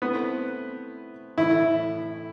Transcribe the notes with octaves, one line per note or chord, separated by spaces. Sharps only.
A3 B3 C4 E4 B4
A2 E3 A3 E4